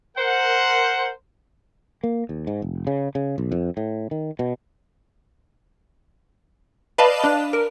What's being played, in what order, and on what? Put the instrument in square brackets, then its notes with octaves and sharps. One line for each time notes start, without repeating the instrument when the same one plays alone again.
[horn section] A#4 C5 F#5
[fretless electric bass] A#3
D#2
G#2
F1
C#3
C#3
B1
F2
A2
D#3
B2
[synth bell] B4 D5 D#5 F5 A5 B5
D4
A#4